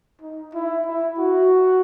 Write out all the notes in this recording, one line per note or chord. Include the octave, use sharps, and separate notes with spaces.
D#4
E4
E4
F#4